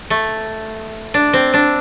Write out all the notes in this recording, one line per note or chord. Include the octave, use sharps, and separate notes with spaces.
A3
D4
C4
D4